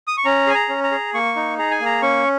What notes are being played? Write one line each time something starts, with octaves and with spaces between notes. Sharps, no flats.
D#6
C#6
C#4 A#5
G#4 G#5
A#5
C#4
A#5
G#4
A#3 C#6
D#4
G#4 A#5
G#5
A#3
A#5
C#4 C#6